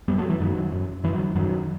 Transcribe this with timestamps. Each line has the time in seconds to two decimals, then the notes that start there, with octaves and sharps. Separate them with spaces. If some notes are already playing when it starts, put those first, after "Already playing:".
0.08 F#2 G3 B3
0.18 F#3 A3
0.30 E3
0.40 F#2 D#3 F#3
0.72 F#2
1.03 F#2 E3
1.14 D#3 F#3
1.35 F#2 D#3 F#3